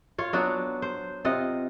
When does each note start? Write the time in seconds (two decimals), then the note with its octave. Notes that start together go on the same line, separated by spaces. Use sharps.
0.18 F4 C#5
0.33 F#3 B3 D4 F#4
0.82 C5
1.25 C3 F4 D#5 F#5